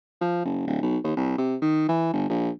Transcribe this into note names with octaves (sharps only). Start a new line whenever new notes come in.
F3
F#1
D1
B1
D#2
C2
C3
D#3
E3
G1
A#1